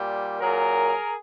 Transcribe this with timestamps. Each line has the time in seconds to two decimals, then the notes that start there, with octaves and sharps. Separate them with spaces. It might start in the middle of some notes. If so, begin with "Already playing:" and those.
Already playing: A#2 G3
0.41 A#2 F#3 G#4 A#4